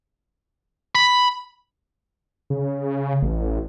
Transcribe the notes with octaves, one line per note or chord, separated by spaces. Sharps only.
B5
C#3
A1